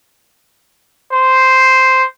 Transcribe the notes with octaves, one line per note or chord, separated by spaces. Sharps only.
C5